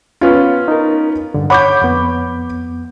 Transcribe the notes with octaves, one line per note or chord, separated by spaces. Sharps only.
B3 C#4 F4
D#4 A#4
G2 D3
C#5 F#5 B5 D6 G6
F2 B3